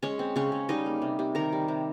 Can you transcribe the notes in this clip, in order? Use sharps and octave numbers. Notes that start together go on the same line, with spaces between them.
G#3 C#4 C#5
C4
C#3 C#4 C#5
C#3
G3 D#4 D#5
A#3
C3
C3
D#3 A#4 A#5
G3
C3